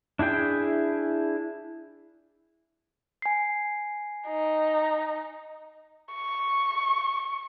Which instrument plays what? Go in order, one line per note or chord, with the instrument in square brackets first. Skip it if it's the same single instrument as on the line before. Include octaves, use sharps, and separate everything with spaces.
[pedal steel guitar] D4 E4 G#4 G5
[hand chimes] G#5 C7
[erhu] D#4
C#6